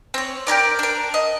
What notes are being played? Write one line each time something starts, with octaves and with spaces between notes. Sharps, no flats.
C4 C#5
G4 G#4 A#4 D5
D4 A#4
D#5